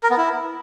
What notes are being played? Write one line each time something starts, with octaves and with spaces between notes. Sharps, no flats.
A#4
B3
E4